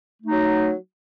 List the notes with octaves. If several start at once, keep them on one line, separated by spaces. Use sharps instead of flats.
F#3 A3 D#4